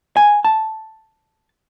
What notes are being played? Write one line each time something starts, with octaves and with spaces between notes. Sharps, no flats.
G#5
A5